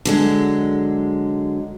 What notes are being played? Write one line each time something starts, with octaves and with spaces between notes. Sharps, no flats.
D3 F#3 G#3